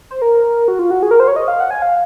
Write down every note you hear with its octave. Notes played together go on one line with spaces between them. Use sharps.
C5
A#4
F#4
F4
F#4
G#4
A#4
C5
C#5
D#5
F5
F#5
G#5
F5